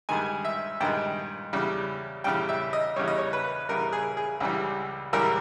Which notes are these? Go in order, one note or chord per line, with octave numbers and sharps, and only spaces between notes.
G2 D#3 G#3 G#5
E5
G2 D#3 G#3 G5
E2 C#3 G3
E2 C#3 G3 G5
E5
D#5
E2 C#3 G3 C#5
D#5
C#5
B4
E2 C#3 G3 A#4
G#4
G#4
C#2 C#3 E3 G3
C#2 C#3 E3 G3 A#4